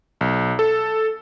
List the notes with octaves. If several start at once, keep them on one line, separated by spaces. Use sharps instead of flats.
B1
A4